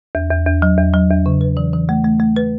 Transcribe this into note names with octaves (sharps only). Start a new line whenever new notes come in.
E2
E2
E2
F#3
E2
F#3
E2
C#3
B4
E3
E3
A3
A3
A3
B4